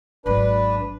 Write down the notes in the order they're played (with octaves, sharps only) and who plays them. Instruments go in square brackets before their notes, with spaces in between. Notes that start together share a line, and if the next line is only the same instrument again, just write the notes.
[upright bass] G#1 F#3 [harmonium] D4 B4